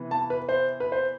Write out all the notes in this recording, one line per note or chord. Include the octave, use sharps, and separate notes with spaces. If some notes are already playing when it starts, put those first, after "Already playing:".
Already playing: C3 E3 B3
A5
B4
C5
B4
C5